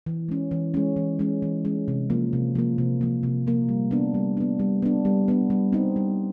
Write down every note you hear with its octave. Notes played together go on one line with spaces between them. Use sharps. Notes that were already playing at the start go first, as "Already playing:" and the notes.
E3
G#3 C#4
E3
G#3 C#4
E3
G#3 C#4
E3
G#3 C#4
C3
F3 A#3
C3
F3 A#3
C3
F3 A#3
C3
F3 A#3
G3
B3 D4
G3
B3 D4
G3
B3 D4
G3
B3 D4
G3
C4 D#4
G3